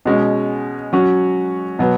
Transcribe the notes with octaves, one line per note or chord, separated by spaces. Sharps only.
B2 G#3 C#4
F#3 C#4 F#4
B2 F#3 B3